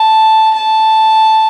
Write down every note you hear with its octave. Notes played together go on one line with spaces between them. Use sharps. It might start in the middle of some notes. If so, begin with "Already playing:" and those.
Already playing: A5
A5